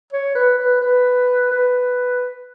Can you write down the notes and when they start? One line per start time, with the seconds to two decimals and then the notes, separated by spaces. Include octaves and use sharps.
0.13 C#5
0.35 B4
0.58 B4
0.81 B4
1.51 B4